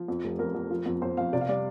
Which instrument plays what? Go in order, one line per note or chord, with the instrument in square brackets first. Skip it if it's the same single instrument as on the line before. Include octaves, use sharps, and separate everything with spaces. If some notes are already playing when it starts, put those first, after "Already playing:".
Already playing: [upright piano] F3
F2
F1
F2 A#4
F2
F3
F2
F2 C5
F2 F5
C3 D5
F5
G3 D5